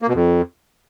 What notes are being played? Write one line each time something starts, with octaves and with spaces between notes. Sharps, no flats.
A#3
B2
F2